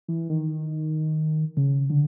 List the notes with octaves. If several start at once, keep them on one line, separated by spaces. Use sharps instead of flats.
E3
D#3
C#3
D3